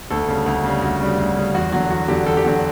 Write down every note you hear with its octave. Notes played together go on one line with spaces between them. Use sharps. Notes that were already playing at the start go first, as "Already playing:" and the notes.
D2 A4
C#3 G3
D2
C#3 G3
D2 F#4
C#3 G3
D2
C#3 G3
E2 F#4
D3 F#3 F#4
E2 F#4
D3 F#3 G4
E2 A4
G4
D3 F#3 F#4